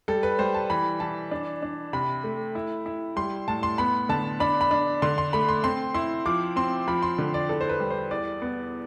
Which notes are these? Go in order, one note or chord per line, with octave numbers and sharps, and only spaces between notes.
G3 A4
B4
G3 C5
A5
E3 B5
E3 A5
D4
D4
C3 B5
A3
E4
E4
G3 C6
A2 A5
C6
B3 B5
D3 A5
D4 B5
B5
D4
D3 C6
C6
A3 B5
C6
C4 C6
E4 C6
F3 D6
C4 C6
F3 B5
C6
D3
D5
E2 A4
C5
B4
G3
C5
E2 D5
B3